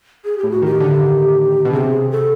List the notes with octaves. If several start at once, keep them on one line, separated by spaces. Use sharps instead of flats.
G#4
G4
A2
F#4
D#3 G4
D3
B2
C3 G#4
A4